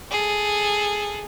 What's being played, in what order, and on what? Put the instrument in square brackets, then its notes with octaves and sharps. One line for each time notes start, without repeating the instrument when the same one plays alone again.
[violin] G#4 A4